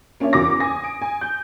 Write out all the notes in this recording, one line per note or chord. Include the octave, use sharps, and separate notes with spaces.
A#3 C#4 D4 C#5 E5
E2 C#4 F#4 A#4 D6 A#6
G#5 D#6 A#6
D7
G#5
G6